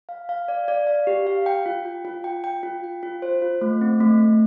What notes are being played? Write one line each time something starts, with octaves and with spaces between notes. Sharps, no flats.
F5
F5
D5
D5
F5
G4
F5
G5
F4
G5
F4
G5
G5
F4
G5
F4
C5
F4
A3
C4
A3
A3